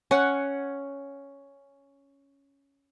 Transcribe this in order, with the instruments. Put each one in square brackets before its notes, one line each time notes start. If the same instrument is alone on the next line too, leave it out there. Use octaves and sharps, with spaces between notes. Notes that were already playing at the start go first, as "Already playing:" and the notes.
[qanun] C#4 F#5